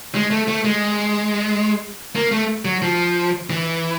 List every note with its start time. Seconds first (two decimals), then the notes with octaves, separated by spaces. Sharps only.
0.15 G#3
0.31 A3
0.48 A3
0.65 G#3
2.15 A#3
2.31 A3
2.65 F#3
2.82 F3
3.50 E3